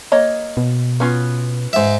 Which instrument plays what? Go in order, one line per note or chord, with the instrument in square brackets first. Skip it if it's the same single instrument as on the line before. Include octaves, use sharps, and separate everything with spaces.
[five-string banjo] A#3 C#5 D#5
[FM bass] B2
[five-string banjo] B3 C#4 F4
[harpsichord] G#2 E5